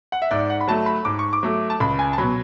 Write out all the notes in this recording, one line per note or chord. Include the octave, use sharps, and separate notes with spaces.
F#5
E5
G#2 D5
F#5
B5
F#3 A3 A5
B5
G#2 D6
C#6
D6
F#3 A3
A5
C#2 B5
G#5
A5
B2 F#3 B5